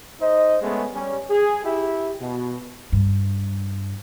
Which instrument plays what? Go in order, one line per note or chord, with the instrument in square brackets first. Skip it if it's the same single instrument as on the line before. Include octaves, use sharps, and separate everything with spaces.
[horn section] D#4 C5 D#5
G#3 A3 B3 C#4 G#4
G3 C#4
G#4
E4 G4 E5
B2
[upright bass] G2